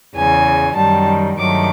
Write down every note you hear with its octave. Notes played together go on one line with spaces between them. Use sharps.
E2 C#3 E3 G#5
F#2 D#3 G3 A5
G2 D#3 F#3 A3 D6